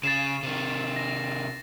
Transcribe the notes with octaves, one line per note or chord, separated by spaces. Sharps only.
C#3 A6 C7 E7
C3 D#3
A#6